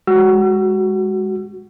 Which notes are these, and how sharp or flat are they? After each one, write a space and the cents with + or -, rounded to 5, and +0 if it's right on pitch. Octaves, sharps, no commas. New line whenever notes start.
G#3 -15 F#4 +15 E6 +40